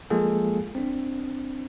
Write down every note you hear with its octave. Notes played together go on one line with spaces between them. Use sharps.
F3 G#3 A#3 F4 G#4 A4
C4 D4